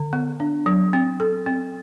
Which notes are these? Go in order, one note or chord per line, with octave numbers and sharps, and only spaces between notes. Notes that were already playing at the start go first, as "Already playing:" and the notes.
Already playing: D3
B3
D4
F#3
C4
A4
C4